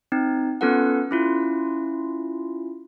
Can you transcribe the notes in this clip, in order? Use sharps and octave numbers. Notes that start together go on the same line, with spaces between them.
C4 D#4
B3 C#4 F4 A4 B4 F#5
C#4 E4 F4